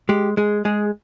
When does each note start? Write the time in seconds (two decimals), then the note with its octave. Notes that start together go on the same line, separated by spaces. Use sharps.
0.09 G#3 G4
0.37 G#3 G#4
0.65 G#3 G#4